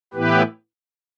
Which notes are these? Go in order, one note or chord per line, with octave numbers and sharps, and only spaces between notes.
A2 E3 B3 E4 G4 B4